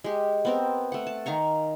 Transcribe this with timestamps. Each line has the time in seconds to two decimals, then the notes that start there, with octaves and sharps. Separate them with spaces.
0.04 G#3 G4
0.45 B3 C4 A#4
0.92 A3 F#5
1.07 A5
1.26 D#3 F5 A#5 C#6